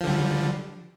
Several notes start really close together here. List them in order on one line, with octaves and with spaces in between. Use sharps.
F3 D3 G3